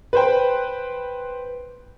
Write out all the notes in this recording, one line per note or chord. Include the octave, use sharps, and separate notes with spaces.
B4 C5 G5